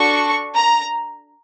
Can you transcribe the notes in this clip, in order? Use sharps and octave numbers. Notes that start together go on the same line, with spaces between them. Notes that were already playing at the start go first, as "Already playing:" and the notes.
Already playing: D4 F#4 A4 C#6
A#5